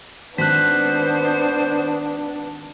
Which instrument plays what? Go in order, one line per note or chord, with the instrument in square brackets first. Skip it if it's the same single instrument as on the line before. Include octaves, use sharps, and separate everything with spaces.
[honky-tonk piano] G#1 A5 [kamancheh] B3 D4 [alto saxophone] C5 [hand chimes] F#6 B6